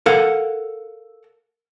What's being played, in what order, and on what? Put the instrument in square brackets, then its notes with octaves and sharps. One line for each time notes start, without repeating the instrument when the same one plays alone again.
[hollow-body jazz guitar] A4 A#4 F5 F#5